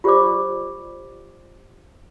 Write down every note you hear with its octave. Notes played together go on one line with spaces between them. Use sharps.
F4 G4 A#4 C5 D5 D6